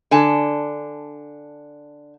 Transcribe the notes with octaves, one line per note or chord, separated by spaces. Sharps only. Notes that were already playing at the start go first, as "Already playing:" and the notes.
D3 G#5 A5